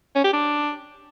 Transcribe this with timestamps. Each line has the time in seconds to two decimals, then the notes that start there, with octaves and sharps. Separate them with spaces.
0.15 C#4
0.24 G4
0.33 D4